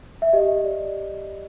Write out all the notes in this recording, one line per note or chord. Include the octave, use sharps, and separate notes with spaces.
E5
G4 D#5
D5